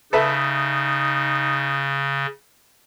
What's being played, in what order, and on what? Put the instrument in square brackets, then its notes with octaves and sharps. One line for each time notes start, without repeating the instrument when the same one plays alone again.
[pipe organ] C#3 [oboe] D#4 [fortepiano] A4 B4 E5